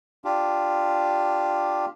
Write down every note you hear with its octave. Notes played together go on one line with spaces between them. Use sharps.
D4 F4 G4